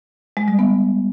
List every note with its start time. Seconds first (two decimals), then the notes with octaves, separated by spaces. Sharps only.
0.37 G#3
0.48 G3
0.59 B3